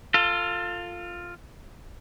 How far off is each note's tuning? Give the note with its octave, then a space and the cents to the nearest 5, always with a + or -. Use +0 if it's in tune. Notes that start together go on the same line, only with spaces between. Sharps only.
F4 +0 A4 +30